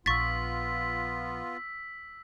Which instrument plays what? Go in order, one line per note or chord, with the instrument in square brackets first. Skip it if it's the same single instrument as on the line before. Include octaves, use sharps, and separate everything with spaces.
[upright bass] A#1 [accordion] B3 F4 [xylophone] C#6 A6 [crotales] E6 B6